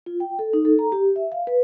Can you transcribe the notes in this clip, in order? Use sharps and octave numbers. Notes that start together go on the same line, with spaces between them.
F4
G5
A4
D#4
A4
A#5
G4
E5
F5
B4